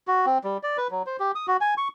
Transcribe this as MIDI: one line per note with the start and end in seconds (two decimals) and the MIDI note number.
0.07 0.26 66
0.26 0.38 60
0.44 0.58 55
0.63 0.77 74
0.78 0.88 71
0.91 1.03 54
1.06 1.17 72
1.19 1.32 67
1.35 1.46 87
1.47 1.57 66
1.61 1.74 80
1.78 1.88 85